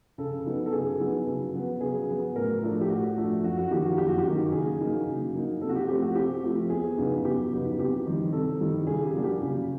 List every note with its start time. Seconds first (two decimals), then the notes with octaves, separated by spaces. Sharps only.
0.18 C#3 A4
0.45 F#3 B3 D#4
0.66 A4
0.72 C#3 G#4
1.00 F#3 B3 D#4
1.27 C#3
1.53 F#3 B3
1.81 C#3 G#4
2.09 F#3 B3
2.36 A2 A#4
2.63 F3 A3 D4
2.81 G4
2.89 A2 F#4
3.17 F3 A3 D4
3.44 F#2 F#4
3.57 F#4
3.71 D#3 F#3 A#3 D#4 G4
3.84 F#4
3.98 F#2 G4
4.08 F#4
4.19 G4
4.26 D#3 F#3 A#3 D#4
4.52 C#3 G#4
4.80 F#3 A#3 D#4
5.07 C#3
5.34 F#3 A#3 D#4
5.61 C3 A4
5.69 F#4
5.76 G4
5.88 F3 A3 C4 G4
6.02 F#4
6.15 C3 G4
6.43 F3 A3 C4
6.70 E2 G#4
6.98 C#3 F#3 B3 D#4
7.24 E2 G4
7.52 C#3 F#3 B3 D#4
7.79 C3 G4
8.06 D#3 G3
8.32 C3 A4
8.61 D#3 G3
8.87 C#3 G#4
9.05 G4
9.15 F#3 A#3 D4
9.24 G4
9.42 C#3